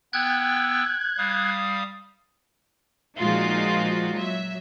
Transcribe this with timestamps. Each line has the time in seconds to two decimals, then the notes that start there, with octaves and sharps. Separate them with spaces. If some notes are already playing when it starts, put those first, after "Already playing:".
0.13 B3 G5 E6 F#6 G#6
1.18 G3 F5 D#6
3.18 A#2 F3 G#3 D#4 F4 F#4
4.14 F#3 E5